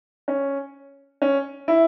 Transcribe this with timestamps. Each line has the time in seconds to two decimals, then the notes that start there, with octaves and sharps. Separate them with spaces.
0.28 C#4
1.22 C#4
1.68 E4